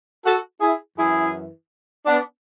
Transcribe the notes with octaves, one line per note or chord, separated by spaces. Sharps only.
F#4 A4
E4 G#4
F#2 E3 E4 G#4
B3 D4